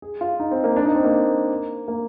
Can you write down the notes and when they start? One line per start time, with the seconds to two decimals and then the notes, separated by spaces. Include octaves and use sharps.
0.02 G#4
0.21 F4
0.40 D#4
0.51 C4
0.64 A#3
0.76 D4
0.86 D#4
0.95 C4
1.04 A#3
1.88 A#3